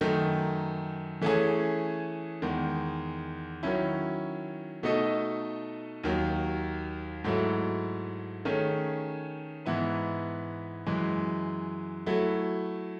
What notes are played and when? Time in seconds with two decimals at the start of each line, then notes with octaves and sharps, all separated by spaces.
0.01 F#2 D#3 A3 D#4
1.21 E3 A3 C#4 G#4
2.42 E2 D#3 G#3
3.63 D#3 F#3 C#4 E4
4.83 B2 A3 D#4 A4 D#5
6.04 D#2 D#3 F#3
7.24 G#2 F#3 A3 E4
8.45 D#3 A3 C#4 G#4
9.66 G#2 E3 B3 E4 B4
10.87 F#2 E3 G#3
12.06 F#3 A3 E4